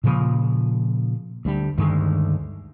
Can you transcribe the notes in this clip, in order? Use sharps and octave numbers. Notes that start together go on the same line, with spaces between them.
A#2 C#3 F3 A#3
D2 G3 D4
D2 G2 D#3 G#3